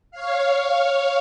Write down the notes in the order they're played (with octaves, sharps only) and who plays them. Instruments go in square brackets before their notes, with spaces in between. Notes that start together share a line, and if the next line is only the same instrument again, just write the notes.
[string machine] C#5 F5